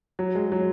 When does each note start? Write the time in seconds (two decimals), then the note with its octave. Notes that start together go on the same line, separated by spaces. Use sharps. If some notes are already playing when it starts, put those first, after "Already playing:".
0.19 F#3
0.35 G#3
0.52 F#3